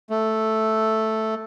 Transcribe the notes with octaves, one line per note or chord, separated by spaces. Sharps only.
A3